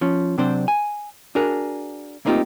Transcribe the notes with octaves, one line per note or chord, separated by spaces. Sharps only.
F3 C#4
C3 F#3 C4 D4 C5
G#5
D4 F#4 G#4 A#4
A3 A#3 C4 D#4 F4 G4